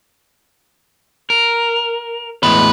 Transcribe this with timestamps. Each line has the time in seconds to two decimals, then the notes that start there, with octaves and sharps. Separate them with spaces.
1.30 A#4
2.43 E2 A2 G#3 B4